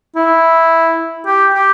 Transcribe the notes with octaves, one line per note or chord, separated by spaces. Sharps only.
E4
G4
G4